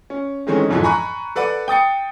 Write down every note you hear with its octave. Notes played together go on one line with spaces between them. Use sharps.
C#4
D#3 E3 G#3 A3 C4 C#4
B1 F2 G#2 D3 E3 F3
G#5 A#5 B5 C#6 F#6
A4 B4 D5 F#5 D6
G5 D#6 A6 C#7